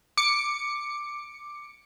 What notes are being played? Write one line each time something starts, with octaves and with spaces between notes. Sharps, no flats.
D6 C#7